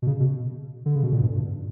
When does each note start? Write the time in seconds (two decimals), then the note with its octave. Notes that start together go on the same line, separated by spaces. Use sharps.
0.02 B2
0.07 C#3
0.20 B2
0.86 D3
0.95 C#3
1.03 B2
1.12 A#2
1.21 G2
1.34 G2